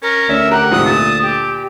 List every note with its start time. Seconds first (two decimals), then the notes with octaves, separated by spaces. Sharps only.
0.02 C#4 A#4
0.29 D2 C#4 E5
0.51 G4 A#4 F#5
0.71 G#2 C3 F3 D#6
0.86 A#2 A5
1.22 G4